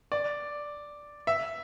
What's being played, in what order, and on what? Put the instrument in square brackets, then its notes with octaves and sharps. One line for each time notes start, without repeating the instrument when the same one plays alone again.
[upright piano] D5
E5